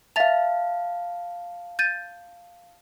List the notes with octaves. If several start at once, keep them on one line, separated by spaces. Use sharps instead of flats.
E5 F5 A5 A6 F7
G6 A6 D#7